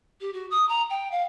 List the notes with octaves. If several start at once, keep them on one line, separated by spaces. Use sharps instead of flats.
G4
F#4
D#6
A#5
G5
F5